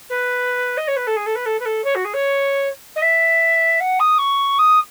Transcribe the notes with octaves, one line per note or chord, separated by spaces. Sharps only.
B4
D#5
C#5
B4
A4
G#4
A4
B4
A4
B4
A4
C#5
F#4
G#4
C#5
D#5
E5
F#5
D#6
C#6
D#6